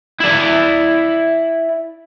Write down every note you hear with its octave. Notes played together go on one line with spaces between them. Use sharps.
E4 D5